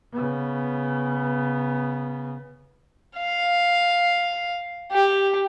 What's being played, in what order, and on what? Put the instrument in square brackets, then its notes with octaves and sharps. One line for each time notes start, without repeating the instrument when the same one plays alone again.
[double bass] C#3 B3
[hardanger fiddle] F5
G4